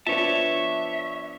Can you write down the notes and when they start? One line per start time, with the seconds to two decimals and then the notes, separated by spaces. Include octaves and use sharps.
0.07 F3 B3 D4 C#5 E5 A5